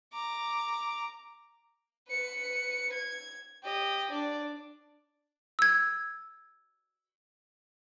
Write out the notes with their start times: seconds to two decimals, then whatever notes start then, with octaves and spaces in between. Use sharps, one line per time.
0.13 A#5 D6
2.09 B4 C#7
2.93 G#6
3.64 G4 D#5
4.10 D4 D5
5.59 E6 G#6